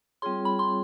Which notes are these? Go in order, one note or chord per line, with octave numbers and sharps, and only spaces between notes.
G3 C4 F4 G#4 C#5 C6
B5
C6